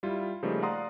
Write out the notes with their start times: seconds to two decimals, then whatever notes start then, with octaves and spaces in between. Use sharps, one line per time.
0.03 G3 E4 F4
0.43 C#3 F3 G3 A3 A#3 D#4
0.62 D5 F5 F#5 A#5 C6 D#6